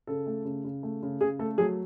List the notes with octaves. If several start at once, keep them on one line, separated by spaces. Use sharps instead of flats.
C#3 A4
A3
C#3
C#3
A3
C#3
C#3 G#4
A3 A4
F#3 G#4